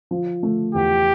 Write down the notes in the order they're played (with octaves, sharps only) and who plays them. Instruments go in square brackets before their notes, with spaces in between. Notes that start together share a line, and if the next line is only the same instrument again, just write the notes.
[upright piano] F3
A3
[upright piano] E2 [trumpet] G4